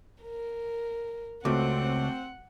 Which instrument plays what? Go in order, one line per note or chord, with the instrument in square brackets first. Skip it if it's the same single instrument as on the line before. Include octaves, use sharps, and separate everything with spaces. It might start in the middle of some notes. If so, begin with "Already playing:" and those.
[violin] A#4
[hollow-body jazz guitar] C#2 [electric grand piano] A3 F#4 D6 [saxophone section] C4 [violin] F#5